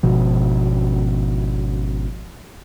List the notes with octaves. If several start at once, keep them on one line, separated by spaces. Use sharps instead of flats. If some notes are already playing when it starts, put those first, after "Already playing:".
G#1 B2 F3